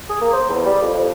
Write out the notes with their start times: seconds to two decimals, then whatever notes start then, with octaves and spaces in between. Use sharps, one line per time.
0.09 G#4
0.21 A#3
0.33 C5
0.49 E2
0.66 G3
0.82 F2
0.94 F2